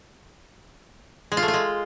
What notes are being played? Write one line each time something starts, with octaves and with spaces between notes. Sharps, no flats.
G#3
F4
A3
F4
G#3